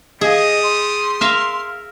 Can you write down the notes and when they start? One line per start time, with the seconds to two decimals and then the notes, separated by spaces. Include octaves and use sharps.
0.21 G3 G#4 D#5 D#6
0.63 C6
1.21 A#4 E5 F5